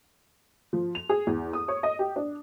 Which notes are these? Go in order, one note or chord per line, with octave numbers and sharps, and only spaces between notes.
F3
F7
G#4
E2
D#6
C#5
D#5
G4
D4